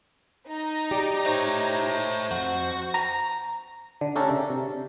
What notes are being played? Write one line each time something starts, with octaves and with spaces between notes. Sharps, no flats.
D#4 A#5
G4 D5
A3 C5 C#5
F2 F#4
A#5
D3
A3 C#4 D4 G4 A4 A#4
C#3
C3